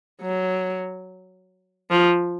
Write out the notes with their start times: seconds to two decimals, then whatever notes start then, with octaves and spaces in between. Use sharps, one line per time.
0.21 F#3
1.90 F3